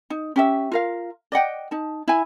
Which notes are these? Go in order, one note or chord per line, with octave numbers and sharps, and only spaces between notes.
D#4
C#4 G4 E5
F4 A#4 F5
D5 D#5 F#5 G5
D#4 A5
E4 G#5